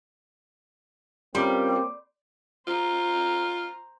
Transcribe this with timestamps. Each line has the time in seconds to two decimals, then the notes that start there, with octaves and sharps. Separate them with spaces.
1.35 G3 A#3 C4 C#4 F4 A#4 C6 D6
2.67 F4 C5 A#5